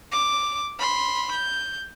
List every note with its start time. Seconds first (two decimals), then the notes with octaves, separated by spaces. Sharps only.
0.11 D6
0.79 B5 C6
1.31 G6